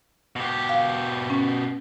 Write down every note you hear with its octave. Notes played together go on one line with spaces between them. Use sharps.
B2 G4
F5
C#4